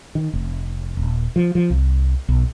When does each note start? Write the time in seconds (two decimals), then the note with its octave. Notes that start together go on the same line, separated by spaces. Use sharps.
0.15 D#3
0.33 F1
0.97 D#1
1.36 F3
1.55 F3
1.70 C2
2.28 B1